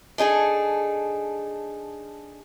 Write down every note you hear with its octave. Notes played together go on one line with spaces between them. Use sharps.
D4 D#4 G#4 A4